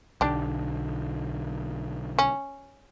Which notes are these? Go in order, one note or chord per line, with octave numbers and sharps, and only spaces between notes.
B1 D3 D4 G4
C#4